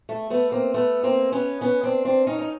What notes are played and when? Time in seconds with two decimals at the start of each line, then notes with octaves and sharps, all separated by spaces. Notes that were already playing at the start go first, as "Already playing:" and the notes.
0.09 A3
0.30 A3 B3
0.52 A#3 C4
0.74 A3 B3
1.03 A#3 C4
1.32 B3 C#4
1.61 B3 C#4
1.83 C4 D4
2.05 C4 D4
2.27 C#4 D#4
2.39 D#4